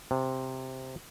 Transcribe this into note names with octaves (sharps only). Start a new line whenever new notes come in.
C3